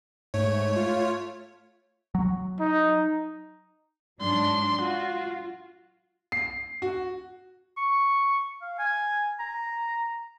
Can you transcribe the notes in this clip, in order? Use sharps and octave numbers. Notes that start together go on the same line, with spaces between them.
G#2 A3 C#5
F4
F#3
D#4
G#2 F#3 D4 C6
F4 F#4
C7
F#4
C#6
F5
G#5
A#5